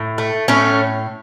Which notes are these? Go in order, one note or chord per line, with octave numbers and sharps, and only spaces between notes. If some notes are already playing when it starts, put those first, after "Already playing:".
Already playing: A2
A3
A2 A3 C#4